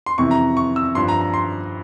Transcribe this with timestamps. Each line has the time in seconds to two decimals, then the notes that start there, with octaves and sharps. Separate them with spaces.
0.06 C6
0.18 F2 C3 E3 C#6
0.31 A#5
0.57 C#6
0.76 E6
0.95 G2 F3 C6
1.08 A#5
1.21 A#5
1.34 C6